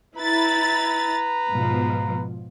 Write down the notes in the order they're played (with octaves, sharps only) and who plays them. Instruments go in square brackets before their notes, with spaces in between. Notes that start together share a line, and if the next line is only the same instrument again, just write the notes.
[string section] E4 B5 A6 [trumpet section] B4 A#5
[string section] G#2 B2 F3